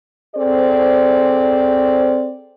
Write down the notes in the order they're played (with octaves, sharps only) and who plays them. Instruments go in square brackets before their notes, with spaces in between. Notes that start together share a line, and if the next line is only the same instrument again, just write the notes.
[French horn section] C4 G#4 A4 C5 D5